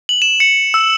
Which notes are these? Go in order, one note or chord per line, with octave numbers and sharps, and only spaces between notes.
F#7
E7
C#7
E6